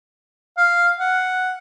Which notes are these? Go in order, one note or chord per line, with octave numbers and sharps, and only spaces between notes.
F5
F#5